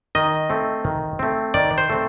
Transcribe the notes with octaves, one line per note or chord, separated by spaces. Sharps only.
D#3 D#5
A3 C4
D#3
A3 C4
D#3 D5
C5
A3 C4